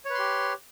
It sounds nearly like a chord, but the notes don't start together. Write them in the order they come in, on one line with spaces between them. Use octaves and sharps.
C#5 B4 C6 G4